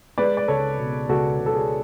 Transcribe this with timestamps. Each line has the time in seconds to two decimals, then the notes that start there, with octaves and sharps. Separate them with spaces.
0.18 G#3 B4 D5
0.37 D5
0.48 C#2 A4 C#5
0.78 B2
1.09 C#2 F#4 A4
1.40 C#2
1.46 A4
1.55 G#4